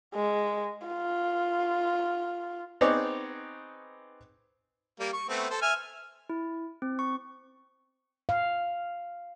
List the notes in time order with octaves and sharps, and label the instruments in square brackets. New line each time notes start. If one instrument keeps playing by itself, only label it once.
[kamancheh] G#3
F4
[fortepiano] B3 C4 D#4 G#4 C#5 D5
[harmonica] G3 A#3
C#6
A3 B3 C4
A4 C5
E5 G#5 F6
[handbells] E4
C4
C#6
[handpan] F5